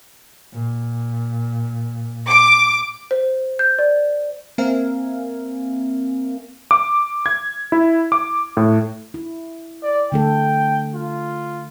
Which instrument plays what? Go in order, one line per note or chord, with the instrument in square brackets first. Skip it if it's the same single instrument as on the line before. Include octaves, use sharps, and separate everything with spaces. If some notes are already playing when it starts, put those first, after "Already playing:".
[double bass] A#2
[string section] D6
[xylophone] C5
G6
D5
[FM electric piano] A#3 C4 A#4 E5 F5 G#5
[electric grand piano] D6
G#6
E4
D6
A2
[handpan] E4
[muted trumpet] D5
[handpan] D3 A3 A4 [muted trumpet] G5
[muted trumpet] F4